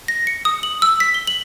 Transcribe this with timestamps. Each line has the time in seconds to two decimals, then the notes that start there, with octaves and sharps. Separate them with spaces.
0.08 A#6
0.27 C#7
0.45 D#6
0.63 F#7
0.82 E6
1.00 B6
1.14 G7
1.27 F#7